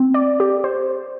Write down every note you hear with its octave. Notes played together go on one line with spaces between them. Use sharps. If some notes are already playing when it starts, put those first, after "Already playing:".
Already playing: C4
D5
G4
C5